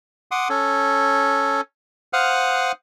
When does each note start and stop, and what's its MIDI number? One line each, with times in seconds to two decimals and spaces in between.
0.31 0.48 78
0.31 0.48 84
0.31 0.48 86
0.31 0.48 87
0.50 1.61 61
0.50 1.61 69
2.13 2.72 72
2.13 2.72 77
2.13 2.72 78
2.13 2.72 87
2.13 2.72 89
2.13 2.72 90